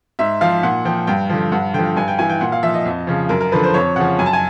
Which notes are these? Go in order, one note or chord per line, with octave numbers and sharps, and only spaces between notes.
G#2 E5
F3 F5
A#2 F#5
F3 G5
G2 G5
D3 F3
G2 F#5
D3 F3 G5
G2 G#5
G5
E3 G#5
G5
A#2 F#5
F5
F3 E5
D#5
F2
C#3 F3
F#2 A#4
A#4
D3 F3 B4
C5
F2 C#5
C#3 F3 F#5
F#2 G#5
A5
G#5